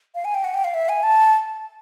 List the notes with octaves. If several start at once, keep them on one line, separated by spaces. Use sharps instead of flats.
F5
G#5
G5
F#5
G5
F5
E5
G#5
A5